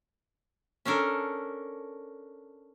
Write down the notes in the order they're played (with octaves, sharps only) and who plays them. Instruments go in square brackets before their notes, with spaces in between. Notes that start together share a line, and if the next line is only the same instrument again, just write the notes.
[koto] C#4 D4 A4 A#4